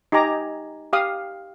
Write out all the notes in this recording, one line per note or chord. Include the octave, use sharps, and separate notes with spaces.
D#4 G4 G#5 A#5 D6
G4 F5 D#6